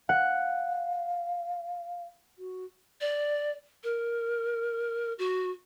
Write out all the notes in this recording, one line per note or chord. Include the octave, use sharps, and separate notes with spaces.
F5 F#5
F#4
D5
A#4
F#4